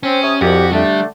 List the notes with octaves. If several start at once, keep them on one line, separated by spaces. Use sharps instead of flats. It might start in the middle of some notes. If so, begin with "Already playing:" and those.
C4 C#4
C3 C#5 D#6
C2 F2 F#4 G4
D3 G3 A3 D4